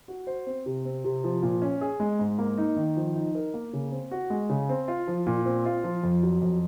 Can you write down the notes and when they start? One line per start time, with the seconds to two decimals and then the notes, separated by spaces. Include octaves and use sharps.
0.08 F#4
0.27 C5
0.46 C4
0.66 C3
0.85 C4
1.04 C3
1.24 F3
1.42 A#2
1.62 C#4
1.81 G#4
2.00 G#3
2.19 G#2
2.38 A#3
2.58 D#4
2.76 D#3
2.97 F3
3.16 D#4
3.35 A#4
3.54 A#3
3.73 C#3
3.92 C4
4.11 F#4
4.30 G#3
4.49 C#3
4.69 C4
4.88 F4
5.08 F3
5.27 A#2
5.46 C4
5.65 F4
5.84 F3
6.03 F2
6.23 F#3
6.41 F2